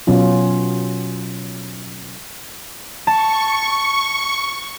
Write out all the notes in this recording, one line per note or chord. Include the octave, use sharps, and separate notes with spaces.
B2 F#3 C#4 F4
A5 C#6